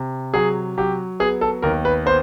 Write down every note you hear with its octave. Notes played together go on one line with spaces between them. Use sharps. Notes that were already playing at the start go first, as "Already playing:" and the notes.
Already playing: C3
F#3 G#4
F#3 G4
B3 G#4
A4
D#2 A#4
B4
B3 C5